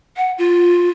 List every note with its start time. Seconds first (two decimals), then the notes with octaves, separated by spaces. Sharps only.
0.17 F#5
0.38 F4